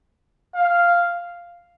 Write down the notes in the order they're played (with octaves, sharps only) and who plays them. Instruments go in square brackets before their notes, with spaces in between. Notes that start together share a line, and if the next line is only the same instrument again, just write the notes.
[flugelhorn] F5